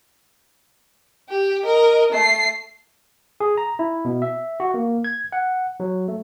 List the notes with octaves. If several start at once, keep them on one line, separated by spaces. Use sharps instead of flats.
G4
A#4 D#5
A3 C7
G#4
A#5
E4
B2
E5
F#4
A#3
G#6
F#5
F#3
A3